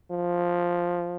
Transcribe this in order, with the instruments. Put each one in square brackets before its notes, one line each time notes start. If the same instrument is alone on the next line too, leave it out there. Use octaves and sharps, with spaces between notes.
[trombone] F3